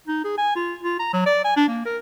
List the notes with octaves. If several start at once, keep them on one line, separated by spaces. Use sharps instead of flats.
D#4
G#4
G#5
F4
F4
A#5
F#3
D5
G#5
D4
A#3
A#4